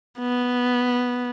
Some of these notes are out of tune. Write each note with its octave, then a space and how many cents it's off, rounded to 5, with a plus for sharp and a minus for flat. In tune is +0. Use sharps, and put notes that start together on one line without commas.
B3 -5